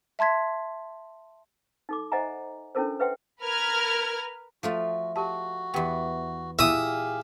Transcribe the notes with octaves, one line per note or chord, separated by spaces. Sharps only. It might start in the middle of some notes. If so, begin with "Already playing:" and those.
E5 A5 C6 G#6 B6
D#4 A4 D6
C5 D#5 E5 F#5 G#5 A#5
C#4 D4 E4 A4 A#4 C5
B4 C5 E5 F#5 G5 C6
A#4 B4 F6 G#6
F3 A3 F4 F#4
F#4 G4 A5
E2 B3 G4 G5
A#2 E4 G4 G#4 E5 F5 D#6